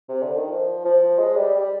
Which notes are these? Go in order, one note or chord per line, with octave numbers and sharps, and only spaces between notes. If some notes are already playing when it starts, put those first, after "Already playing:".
C3
D3
D#3
F3
F3
G#3
G3
G3